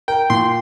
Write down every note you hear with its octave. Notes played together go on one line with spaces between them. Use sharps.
A#4 G5
A#2 C6